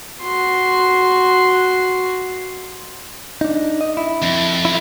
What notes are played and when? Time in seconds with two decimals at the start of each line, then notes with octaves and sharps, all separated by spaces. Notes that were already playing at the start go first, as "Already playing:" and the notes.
0.22 F#4 C6
3.41 D4 D#4
3.81 D#5
3.97 E4
4.22 F2
4.65 E4